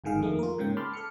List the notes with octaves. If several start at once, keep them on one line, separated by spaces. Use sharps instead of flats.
G1 G#2 D#3 G#4 F5
F2 D#3 A3 A#3
F4 A#4
G#2 C#3 A#3 G5
A5 B5 C6 D6 F6
A4 F6 C#7